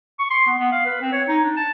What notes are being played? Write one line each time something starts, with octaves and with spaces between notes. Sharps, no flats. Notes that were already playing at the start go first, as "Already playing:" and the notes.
C#6
C6
B3
B3
F5
B4
C4
C#5
D#4
D4
A5